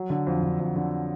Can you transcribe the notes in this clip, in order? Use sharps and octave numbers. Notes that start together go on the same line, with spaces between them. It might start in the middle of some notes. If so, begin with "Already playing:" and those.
Already playing: F#3
D3
F2
D3
F2
D3